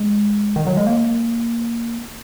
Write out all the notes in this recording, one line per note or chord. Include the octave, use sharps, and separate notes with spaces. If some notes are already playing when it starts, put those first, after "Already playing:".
Already playing: G#3
D#3
F#3
G#3
A#3